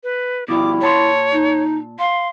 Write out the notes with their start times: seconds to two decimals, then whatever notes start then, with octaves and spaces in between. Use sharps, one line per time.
0.04 B4
0.48 B2 F3 G3 E4 D6
0.81 A#2 C#5 A5 C6
1.33 D#4
1.99 F5 C6